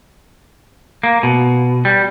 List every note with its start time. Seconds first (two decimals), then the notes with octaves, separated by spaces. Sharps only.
1.03 A#3
1.23 B2
1.85 G3